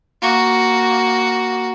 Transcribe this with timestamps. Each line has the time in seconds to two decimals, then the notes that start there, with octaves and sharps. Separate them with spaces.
0.22 A#3 F#4